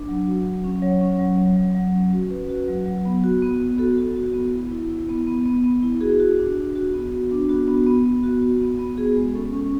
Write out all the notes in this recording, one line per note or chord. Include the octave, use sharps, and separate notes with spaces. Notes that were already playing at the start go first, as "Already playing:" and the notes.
Already playing: D4
F#3
F#4
F#3
C#4
F#3 C#5
C#4
F#3
F#3
F#3
F#3
C#4
F#4
C#4 B4
F#4
F#3
F#3
B3
F#4
B3
B3
F#4 A4
F#4
F#4
B3
E4
E4
E4
B3
B3
B3
B3
E4
F#4 G#4
F#4
D4
F#4
F#4
B3
F#4
D4
B3 F#4
B3
B3
B3
F#4
F#4
B3
B3
F#4 G#4
G#3
C#4 A4
C#4